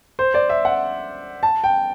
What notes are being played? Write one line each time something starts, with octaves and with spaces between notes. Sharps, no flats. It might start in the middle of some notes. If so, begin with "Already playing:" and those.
C5
D5
E5
F#5
A5
G5